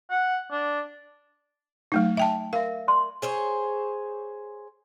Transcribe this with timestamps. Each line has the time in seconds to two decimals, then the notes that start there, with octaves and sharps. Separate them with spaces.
0.11 F#5
0.52 D4
1.92 F#3 A3 D#4
2.17 E5 G5 A5
2.53 A#4 E5 F5
2.88 D5 C6
3.22 G#4 C5 C#5